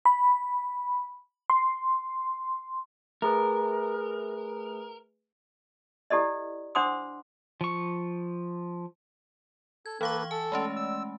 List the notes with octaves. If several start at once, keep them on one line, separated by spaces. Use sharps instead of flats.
B5
C6
A3 G#4 A#4 B4
E4 G4 A4 D5 D#5
D4 C5 F#5 C6 D6 D#6
F3 C#6
A4 G#6
E3 A#3 A4 B4 F5 C#6
A4 G#5
G#3 A3 C#4
E6